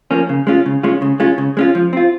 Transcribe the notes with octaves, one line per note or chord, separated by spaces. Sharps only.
F3 A#3 C#4
C#3
G#3 C#4 F4
C#3
G#3 C#4 F4
C#3
G#3 C#4 F4
C#3
G#3 C#4 F4
F3
C4 F4